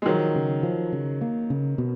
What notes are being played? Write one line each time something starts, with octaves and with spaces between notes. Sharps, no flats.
G#3
D#3 F3 F#3
C#3
F3
C#3
A#3
C#3
B2